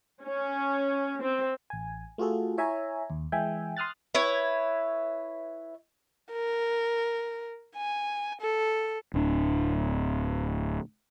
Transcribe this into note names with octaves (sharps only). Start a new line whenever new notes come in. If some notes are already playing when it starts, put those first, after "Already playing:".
C#4
C4
A1 G#5
A3 F4 F#4 G#4 A4
E4 C#5 E5 G#5 A#5
D#2
E3 G#3 E5 G5 G#5
C6 D#6 F6 F#6 A6
E4 B4 C#5
A#4
G#5
A4
D1 D4